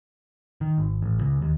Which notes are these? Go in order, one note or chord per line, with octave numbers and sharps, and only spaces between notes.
D#3
G#1
A1
C#2
D#2